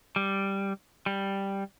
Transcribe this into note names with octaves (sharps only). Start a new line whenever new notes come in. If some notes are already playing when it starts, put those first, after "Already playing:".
G3
G3